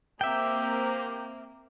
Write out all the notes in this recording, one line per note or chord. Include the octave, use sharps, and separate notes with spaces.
A#3 C4 G4 E5 G5